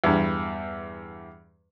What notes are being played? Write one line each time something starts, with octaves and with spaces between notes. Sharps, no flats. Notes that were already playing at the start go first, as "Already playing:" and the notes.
E2 G2